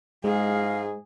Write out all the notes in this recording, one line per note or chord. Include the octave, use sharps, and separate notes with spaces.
G#2 G#3 G#4 D#5 F5